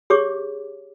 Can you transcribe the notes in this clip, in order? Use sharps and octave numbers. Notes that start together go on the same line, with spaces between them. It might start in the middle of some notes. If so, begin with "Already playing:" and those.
G4 G#4 C#5 D6